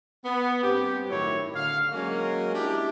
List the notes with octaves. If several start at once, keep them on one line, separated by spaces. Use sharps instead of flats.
B3
G2 C4 G4
A2 D#3 F#3 E4 C#5
D3 F5
F#3 G#3 A#3 C#4
D4 E4 G4